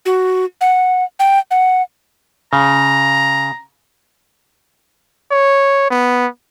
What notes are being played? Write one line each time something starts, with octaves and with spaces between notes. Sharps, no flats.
F#4
F#5
G5
F#5
C#3 A#5
C#5
B3